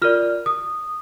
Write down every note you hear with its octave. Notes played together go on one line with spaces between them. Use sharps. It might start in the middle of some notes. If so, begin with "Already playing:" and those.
F4 A#4 D5 F6
D#6